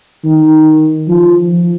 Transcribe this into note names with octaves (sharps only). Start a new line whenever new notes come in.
D#3
F3